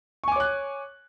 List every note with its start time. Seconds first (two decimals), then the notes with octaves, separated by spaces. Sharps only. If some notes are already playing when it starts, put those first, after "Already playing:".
0.24 C#6
0.28 G#5
0.32 D6
0.36 C#5
0.40 F#6